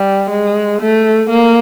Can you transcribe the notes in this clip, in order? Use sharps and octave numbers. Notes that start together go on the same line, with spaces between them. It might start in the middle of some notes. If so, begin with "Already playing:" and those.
Already playing: G3
G#3
A3
A#3